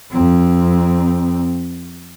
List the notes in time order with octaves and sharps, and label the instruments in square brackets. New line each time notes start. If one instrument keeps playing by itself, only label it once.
[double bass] F2 C4